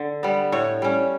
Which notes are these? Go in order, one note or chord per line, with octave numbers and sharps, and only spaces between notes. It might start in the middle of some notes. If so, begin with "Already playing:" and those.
Already playing: D3
G3 B3
A2 C#5
G3 C#4